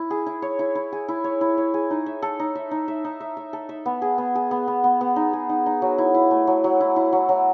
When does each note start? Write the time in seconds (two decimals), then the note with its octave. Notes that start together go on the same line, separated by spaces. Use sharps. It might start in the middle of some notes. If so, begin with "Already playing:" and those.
Already playing: E4
0.10 G#4
0.26 E4
0.42 C#5
0.59 E4
0.75 E4
0.92 G#4
1.08 E4
1.24 C#5
1.41 E4
1.57 C#5
1.74 G#4
1.90 D#4
2.06 E5
2.22 A4
2.39 D#4
2.55 E5
2.71 D#4
2.88 E5
3.04 D#4
3.20 E5
3.37 E5
3.53 A4
3.69 E5
3.86 B3
4.02 G#4
4.18 B3
4.35 G#4
4.51 B3
4.68 B3
4.84 B3
5.01 B3
5.16 D#4
5.33 G#4
5.49 D#4
5.66 D#4
5.82 F#3
5.98 E4
6.14 E4
6.31 A3
6.47 F#3
6.64 F#3
6.80 E4
6.96 E4
7.13 F#3
7.29 F#3